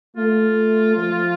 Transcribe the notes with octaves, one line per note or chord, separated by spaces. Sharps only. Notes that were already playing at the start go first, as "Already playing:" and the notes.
A3 F4
F3